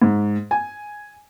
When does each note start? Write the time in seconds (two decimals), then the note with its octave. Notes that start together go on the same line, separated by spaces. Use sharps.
0.02 G#2
0.51 G#5